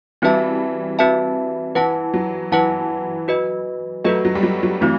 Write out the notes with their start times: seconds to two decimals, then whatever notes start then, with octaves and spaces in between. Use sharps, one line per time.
0.22 E3 G3 C4 F#4 B4 E5 A5
0.99 C4 F#4 B4 E5 A5
1.75 E3 E4 B4 F#5 A5
2.14 F#3
2.52 E3 E4 B4 F#5 A5
3.28 F#4 B4 D#5
4.04 F#3 A3 F#4 B4 D#5
4.25 F#3
4.35 G3
4.43 F#3
4.63 F#3
4.81 E3 A3 C4 F#4